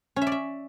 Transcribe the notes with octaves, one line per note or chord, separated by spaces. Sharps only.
C#4
E5
D5
E5